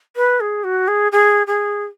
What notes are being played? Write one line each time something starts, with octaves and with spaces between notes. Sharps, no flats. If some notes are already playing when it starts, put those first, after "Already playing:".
B4
G#4
F#4
G#4
G#4
G#4